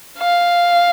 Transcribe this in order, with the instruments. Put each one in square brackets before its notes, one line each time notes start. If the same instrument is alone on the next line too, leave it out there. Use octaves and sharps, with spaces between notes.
[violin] F5